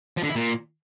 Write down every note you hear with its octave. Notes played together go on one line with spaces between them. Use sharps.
F3
D3
E4
A#2